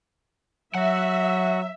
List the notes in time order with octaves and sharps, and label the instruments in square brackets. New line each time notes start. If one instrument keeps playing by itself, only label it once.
[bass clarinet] F#3 [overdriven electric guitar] F#4 F#5 [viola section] E5